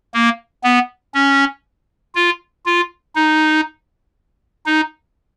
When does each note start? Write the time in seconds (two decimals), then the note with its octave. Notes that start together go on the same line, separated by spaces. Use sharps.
0.14 A#3
0.64 B3
1.14 C#4
2.15 F4
2.66 F4
3.16 D#4
4.66 D#4